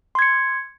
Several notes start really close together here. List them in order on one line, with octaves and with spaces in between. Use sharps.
C6 G#6 C#7